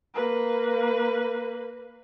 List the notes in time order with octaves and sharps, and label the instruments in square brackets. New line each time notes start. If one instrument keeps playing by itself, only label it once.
[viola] A#3 B4